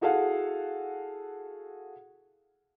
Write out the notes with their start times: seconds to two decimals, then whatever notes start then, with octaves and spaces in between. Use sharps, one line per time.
0.01 E4 F#4 G#4 A4 F5 F#5